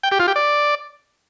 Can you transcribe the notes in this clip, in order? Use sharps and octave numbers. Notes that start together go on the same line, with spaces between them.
G5
G4
F4
G4
D5